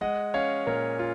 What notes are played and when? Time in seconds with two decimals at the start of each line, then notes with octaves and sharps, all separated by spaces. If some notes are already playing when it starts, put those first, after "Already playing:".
0.01 G#3 D#5 F#5
0.34 C#4 C#5 F5
0.67 A#2 A#4 C#5
0.99 F4